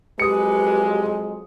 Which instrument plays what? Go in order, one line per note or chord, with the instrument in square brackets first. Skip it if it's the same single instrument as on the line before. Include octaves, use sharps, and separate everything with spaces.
[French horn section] F2 F#3 G#3 [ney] G4 [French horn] B4 [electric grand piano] D#6 C#7